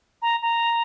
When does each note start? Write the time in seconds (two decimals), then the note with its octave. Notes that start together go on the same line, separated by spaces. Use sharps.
0.22 A#5
0.42 A#5